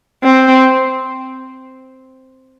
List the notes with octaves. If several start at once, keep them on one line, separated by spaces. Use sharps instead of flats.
C4